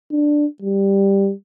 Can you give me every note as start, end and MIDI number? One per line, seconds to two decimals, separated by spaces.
0.11 0.46 62
0.62 1.32 55